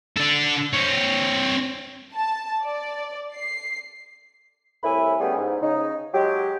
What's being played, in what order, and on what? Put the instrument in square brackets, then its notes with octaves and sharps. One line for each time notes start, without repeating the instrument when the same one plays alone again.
[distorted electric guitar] D4 A4
C4 C#5
[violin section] A5
D5
C7
[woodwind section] C2 A2 E4 E5 G#5 B5
G3 A3 B3 C#4 G4 G#4
G#2
C#3 D#4
F#3 G#3 G4